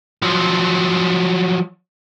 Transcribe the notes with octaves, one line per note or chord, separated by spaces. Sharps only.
F3 F#3